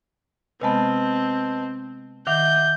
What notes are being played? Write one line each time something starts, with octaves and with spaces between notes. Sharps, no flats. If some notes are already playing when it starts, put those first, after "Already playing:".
C3 G#3 B3 C4 B4 D#5 A5
D#3 E5 F#5 D6 G6